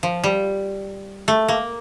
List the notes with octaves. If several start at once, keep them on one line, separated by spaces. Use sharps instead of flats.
F3
G3
A3
A#3